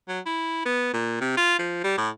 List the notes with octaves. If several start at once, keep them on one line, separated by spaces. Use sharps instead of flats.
F#3
E4
B3
A#2
C3
F4
F3
G3
A2